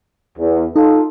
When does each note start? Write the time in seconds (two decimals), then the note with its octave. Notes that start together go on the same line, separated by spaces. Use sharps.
0.37 E2
0.76 D#4 F4 A4